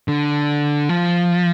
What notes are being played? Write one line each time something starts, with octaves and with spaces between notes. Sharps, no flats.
D3
F3